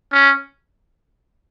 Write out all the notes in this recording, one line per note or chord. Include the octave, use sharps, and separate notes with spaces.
C#4